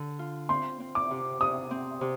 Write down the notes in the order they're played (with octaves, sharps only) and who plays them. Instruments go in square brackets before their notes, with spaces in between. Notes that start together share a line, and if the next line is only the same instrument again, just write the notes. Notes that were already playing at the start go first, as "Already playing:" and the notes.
Already playing: [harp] D3
F4
[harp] C4 [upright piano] C6
[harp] C4
[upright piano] D6
[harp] C3
[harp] C3 [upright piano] D#6
[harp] C4
C3